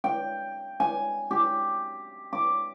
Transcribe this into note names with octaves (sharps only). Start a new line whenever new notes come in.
G5
G#5
G4
D6